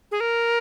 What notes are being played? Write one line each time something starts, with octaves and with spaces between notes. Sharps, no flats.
G#4
A#4